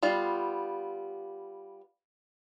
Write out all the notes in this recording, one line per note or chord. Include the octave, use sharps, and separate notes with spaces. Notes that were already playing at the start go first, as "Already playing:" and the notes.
G3 B3 F4 F5